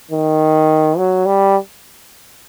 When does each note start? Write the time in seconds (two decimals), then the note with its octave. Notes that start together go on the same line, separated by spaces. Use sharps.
0.11 D#3
0.98 F#3
1.26 G3